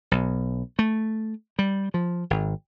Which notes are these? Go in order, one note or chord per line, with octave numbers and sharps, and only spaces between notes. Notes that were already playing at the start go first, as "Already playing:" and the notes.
B1
A3
G3
F3
G#1